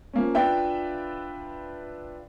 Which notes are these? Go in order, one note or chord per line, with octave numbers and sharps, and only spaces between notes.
F3 A#3 C#4
D4 F4 B4 E5 G5